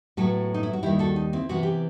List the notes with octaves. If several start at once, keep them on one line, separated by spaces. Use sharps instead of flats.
A2 F#3 B3 F#4 A4
D#4
E4
F#4
D#2 D#3 G3 E4 G4
F#4 A4
D#4
C4 E4
C3 E3 B3 F#4
G4